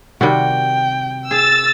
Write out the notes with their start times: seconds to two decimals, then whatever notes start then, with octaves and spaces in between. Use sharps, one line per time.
0.21 C3 D#3 G3 F#4 G5
1.31 G#4 E6 A6